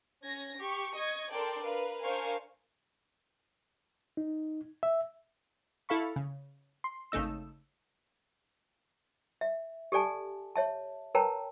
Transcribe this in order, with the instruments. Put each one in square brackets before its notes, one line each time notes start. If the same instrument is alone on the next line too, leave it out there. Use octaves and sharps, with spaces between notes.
[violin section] C#4 G#6 A#6
G4 C#6
D#5 C#6 G#6
D4 A4 A#4 D5 G5 C6
A#4 B4 F5
D4 A#4 C5 F5 G#5 C#6
[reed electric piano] D#4
E5
[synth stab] E4 A4 F5 B5 C#6
C#3
C6
G#1 C#3 A3 D#4 E6
[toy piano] E5
G4 A4 D5 G#5 A5
C#5 E5 A5
A#4 B4 C#5 G5 A5 A#5